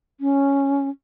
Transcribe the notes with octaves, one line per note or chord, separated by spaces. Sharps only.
C#4